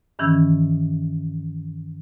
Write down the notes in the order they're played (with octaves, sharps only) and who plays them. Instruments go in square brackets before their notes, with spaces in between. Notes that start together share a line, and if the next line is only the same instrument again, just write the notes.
[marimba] G2 D#3 E3 C#4 E6 G#6